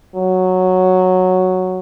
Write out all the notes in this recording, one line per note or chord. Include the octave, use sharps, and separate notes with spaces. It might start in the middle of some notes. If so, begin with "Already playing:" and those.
F#3